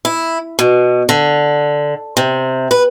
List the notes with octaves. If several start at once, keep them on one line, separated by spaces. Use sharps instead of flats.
E4
B2
D3
C3
B4